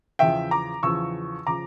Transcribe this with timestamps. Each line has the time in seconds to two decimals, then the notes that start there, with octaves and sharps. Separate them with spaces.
0.19 E2 C#3 F3 E5 G5
0.51 A#5 D6
0.83 E2 C#3 F3 C#6 E6
1.47 C#3 F3 A#5 D6